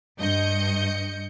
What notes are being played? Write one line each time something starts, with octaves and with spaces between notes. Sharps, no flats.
G2 D#5 G6 C#7